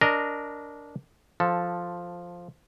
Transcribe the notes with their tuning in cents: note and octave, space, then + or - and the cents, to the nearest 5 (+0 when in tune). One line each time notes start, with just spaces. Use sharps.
D4 -15 A#4 +0 D#5 -15
F3 +0 A4 +0